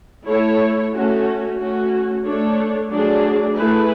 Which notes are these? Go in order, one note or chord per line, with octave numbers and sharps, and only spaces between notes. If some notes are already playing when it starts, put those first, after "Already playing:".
A3 E4 A4 C#5
A3 C#4 F#4
A3 C#4 F#4
A3 D4 A4 C#5
F#3 A3 D4 G#4 D5
A3 E4 G#4 B4